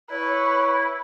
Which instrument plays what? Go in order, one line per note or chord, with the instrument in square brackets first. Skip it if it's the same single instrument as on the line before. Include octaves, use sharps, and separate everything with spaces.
[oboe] E4 [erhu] B4 [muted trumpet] C#5